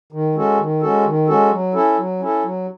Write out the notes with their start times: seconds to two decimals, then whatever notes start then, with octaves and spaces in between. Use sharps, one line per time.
0.12 D#3
0.35 G#3 C#4 F#4 A4
0.59 D#3
0.82 G#3 C#4 F#4 A4
1.05 D#3
1.28 G#3 C#4 F#4 A4
1.51 F#3
1.74 C#4 E4 A4
1.98 F#3
2.20 C#4 E4 A4
2.43 F#3